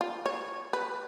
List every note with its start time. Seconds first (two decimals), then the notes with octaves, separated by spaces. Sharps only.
0.01 F4
0.26 C#5
0.73 B4